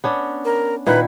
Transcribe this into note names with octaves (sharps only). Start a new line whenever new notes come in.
B3 C#4 D4
A#4
A#2 D#3 E4 B4